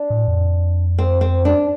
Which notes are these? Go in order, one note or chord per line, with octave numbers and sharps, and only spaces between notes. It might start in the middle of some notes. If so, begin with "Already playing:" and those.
Already playing: D4
A2
F2
C4
C4
D4